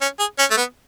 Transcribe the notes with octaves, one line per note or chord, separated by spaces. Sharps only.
C#4
G#4
C#4
A3
B3